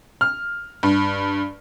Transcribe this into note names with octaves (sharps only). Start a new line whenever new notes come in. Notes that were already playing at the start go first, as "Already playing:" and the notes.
F6
G2